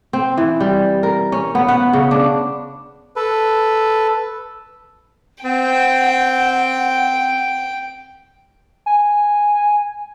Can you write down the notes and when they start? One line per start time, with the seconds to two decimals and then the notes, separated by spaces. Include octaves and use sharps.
0.13 C4
0.38 E3
0.60 G3
1.03 A#4
1.32 C#4
1.55 B3
1.68 F#5
1.93 C#3
2.11 D4
3.16 A4 B4
5.44 C4 F#5 G5
8.86 G#5